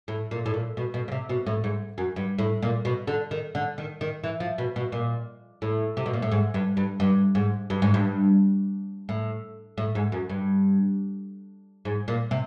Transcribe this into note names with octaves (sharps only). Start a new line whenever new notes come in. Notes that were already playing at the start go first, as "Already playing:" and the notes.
A2
A#2
A2
A#2
B2
B2
C#3
C3
B2
A2
G#2
F#2
G2
A2
A#2
B2
D3
D#3
D3
D#3
D#3
E3
F3
B2
B2
A#2
A2
C3
B2
A#2
A2
G#2
G2
G2
G2
G#2
G2
G#2
G2
A2
A2
G#2
F#2
G2
G#2
A#2
C3